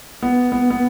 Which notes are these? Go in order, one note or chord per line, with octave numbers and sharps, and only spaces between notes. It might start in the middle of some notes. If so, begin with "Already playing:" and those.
B3
B3
B3